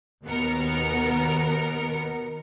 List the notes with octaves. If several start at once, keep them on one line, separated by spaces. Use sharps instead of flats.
D#2 B2 B3 A#4 C#7